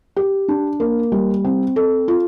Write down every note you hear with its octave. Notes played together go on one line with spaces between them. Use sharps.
G4
D4
A#3
G3
C4
A4
F4